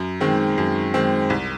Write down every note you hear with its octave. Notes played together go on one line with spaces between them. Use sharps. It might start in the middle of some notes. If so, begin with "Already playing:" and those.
Already playing: F#2
D#3 G#3 C4
F#2
D#3 G#3 C4
C2